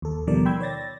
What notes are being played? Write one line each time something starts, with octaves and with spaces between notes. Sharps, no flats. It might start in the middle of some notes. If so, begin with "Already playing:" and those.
D#2 A4
B2 D#3 F3 G3 A#4 D5
G5 B5 C6 E6 G6 G#6
C#5 D5 A6 A#6